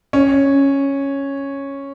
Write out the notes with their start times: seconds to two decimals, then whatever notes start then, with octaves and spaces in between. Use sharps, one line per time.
0.13 C#4